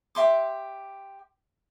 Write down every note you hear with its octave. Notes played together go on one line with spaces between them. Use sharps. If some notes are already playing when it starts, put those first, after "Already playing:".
G4 E5 C6 D6